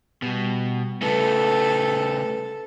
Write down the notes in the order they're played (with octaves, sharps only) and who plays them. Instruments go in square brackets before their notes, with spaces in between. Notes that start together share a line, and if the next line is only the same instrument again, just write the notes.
[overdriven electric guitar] B2 [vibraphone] G3 G4
[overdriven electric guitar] C#3 A3 [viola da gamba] A4 [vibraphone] B4